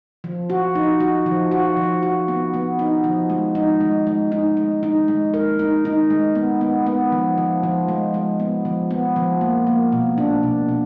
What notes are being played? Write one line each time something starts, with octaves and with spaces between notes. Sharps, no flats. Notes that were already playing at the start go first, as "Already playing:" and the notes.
F3
F#4
D#4
F#4
F3
F#4
F3
F#4
B3
B3
D#4
F3
G#3
D#4
G#3
G#3
D#4
G#3
D#4
G#3
A#4
D#4
D#4
G#3
B3
B3
B3
F3
F3
F3
G#3
G#3
B3
F3
B3
F3
A#3
A#3
B2
D4
B2
B2